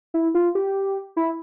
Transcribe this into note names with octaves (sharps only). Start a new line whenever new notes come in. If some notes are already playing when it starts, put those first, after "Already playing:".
E4
F4
G4
E4